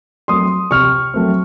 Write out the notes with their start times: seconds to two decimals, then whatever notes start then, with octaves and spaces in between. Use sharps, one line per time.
0.28 F#3 A3 C4 C6 D#6
0.71 C3 C#6 F6
1.14 F#3 A3 C4